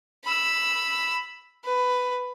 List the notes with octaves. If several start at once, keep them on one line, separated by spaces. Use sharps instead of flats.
B5 E6
B4